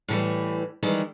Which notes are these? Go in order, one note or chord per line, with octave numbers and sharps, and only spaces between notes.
A2 E3 G3
D#3 E3 G3 G#3